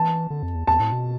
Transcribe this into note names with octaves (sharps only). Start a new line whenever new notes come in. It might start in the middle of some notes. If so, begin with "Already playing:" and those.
Already playing: E3 A5
D3
F2
E2
E2 A5
A2
B2